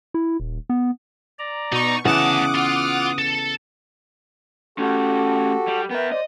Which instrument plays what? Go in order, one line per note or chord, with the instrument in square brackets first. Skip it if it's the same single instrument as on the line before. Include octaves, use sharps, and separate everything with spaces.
[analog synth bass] E4
D#1
B3
[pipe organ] D5 A#5
[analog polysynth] B2 C#6 [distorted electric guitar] D#4
[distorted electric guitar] D2 A5 [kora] C#3 E3 B3 [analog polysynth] F#5 D6 [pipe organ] D#6
[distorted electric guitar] F4
A4
[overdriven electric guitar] A3 C#4 [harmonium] F#4 G4 A4
[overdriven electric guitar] G3
[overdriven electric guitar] B3 E5 [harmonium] A#4 B4 G5
[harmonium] C5 D5 [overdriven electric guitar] D#5